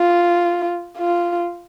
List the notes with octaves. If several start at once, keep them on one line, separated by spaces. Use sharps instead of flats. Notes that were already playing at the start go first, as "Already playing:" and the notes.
Already playing: F4
F4